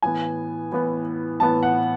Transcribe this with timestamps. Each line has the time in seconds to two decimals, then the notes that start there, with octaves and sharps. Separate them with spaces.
0.02 A2 E3 B3 G#5
0.72 A2 E3 B3
1.40 A2 E3 B3 A5
1.63 F#5